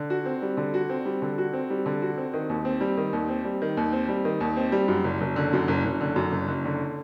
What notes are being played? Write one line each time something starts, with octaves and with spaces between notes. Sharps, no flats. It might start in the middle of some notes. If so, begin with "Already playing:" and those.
Already playing: D3
F#4
C4
G3
D3
F#4
C4
G3
D3
F#4
C4
G3
D3
F#4
C4
D#3
D#2
C4
G3
D#3
D#2
C4
G3
D#3
D#2
C4
G3
D#3
D#2
C4
G3
F#2
F#1
F#1
D3
F#2
F#1
F#1
D3
F#2
F#1
F#1
D3